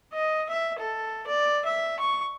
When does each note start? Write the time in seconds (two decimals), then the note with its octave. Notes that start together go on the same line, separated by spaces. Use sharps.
0.14 D#5
0.49 E5
0.79 A4
1.27 D5
1.65 E5
1.99 C#6